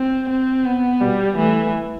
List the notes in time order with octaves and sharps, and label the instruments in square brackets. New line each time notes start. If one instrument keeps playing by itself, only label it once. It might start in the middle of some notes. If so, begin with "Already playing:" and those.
Already playing: [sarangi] C4
C4
B3
[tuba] B2 [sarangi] G3
[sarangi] E3 [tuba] A3